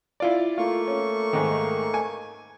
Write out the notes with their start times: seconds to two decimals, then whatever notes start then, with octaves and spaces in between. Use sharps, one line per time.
0.20 E4 F4 D5
0.58 A3 A#3 F4 C#6
0.88 C#4
1.33 G#2 D#3
1.94 G#5